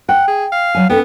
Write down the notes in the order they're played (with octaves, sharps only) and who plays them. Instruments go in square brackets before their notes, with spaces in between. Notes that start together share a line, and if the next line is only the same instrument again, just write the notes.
[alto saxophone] F#5 [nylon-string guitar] G5
[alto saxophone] G#4
F5
[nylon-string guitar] F#3 G#5
[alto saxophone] B3 [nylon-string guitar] C#4 A4 G5